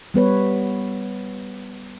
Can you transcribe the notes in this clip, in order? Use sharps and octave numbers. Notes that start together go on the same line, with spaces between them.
G3 B3 B4 C#5